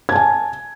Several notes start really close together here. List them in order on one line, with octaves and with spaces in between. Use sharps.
G#6 A5 G#5